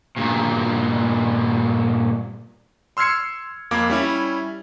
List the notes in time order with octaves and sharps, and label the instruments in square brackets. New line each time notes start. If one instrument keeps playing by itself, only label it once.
[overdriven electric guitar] G2 A#2
[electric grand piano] C6 E6 F6 G#6 C7 C#7
F2 A#3 F5 D6 G#6
G3 C#4 E4